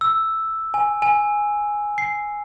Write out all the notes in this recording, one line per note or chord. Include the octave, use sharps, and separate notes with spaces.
E6
G#5
G#5
C7